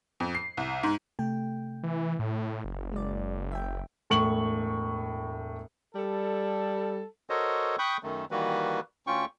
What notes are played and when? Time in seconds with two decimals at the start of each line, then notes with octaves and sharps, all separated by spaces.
0.20 F2
0.35 C7
0.57 C2
0.83 G#2
1.19 C3 A3 G5
1.83 E3
2.19 A2
2.65 F#1
2.93 G#3 D5
3.52 E5 G5
4.10 E1 A2 C#6 F#7
5.95 G3 A4
7.30 F#4 A4 A#4 C5 C#5 D#5
7.79 G5 B5 C#6 D#6 F#6 G6
8.03 F#2 D#3 A3
8.31 D#3 E3 G3 A#3 F#4 B4
9.07 D2 C#4 F4 G5 C#6